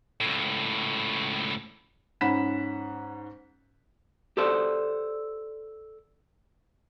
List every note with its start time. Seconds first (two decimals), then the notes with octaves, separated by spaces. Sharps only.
0.21 C#2 A2
2.21 G#2 C#4 F#5 B5 B6 E7
4.37 G4 A4 C5 D5